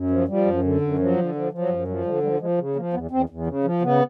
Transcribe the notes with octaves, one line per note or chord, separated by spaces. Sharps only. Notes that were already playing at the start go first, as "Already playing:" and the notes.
Already playing: F#2
F3
F3 G3
F#2
D3
F#2
F3 F#3
D3
F3
F3
F#3
F#2 G3
F3 F#3
D3 G3
F3 G3
F3 G#3
C#3
F3 A#3
E2 B3
E2 C4
E2
C#3
F3
C#3 B3